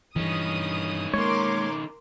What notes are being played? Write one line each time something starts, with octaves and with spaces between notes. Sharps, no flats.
G2 D#3 E3 C#4 D#6
G#3 A#3 A#4 C#5 C6 D6